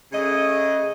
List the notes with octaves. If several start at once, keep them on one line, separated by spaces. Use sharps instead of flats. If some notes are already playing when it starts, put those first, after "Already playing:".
C#3 A3 D#5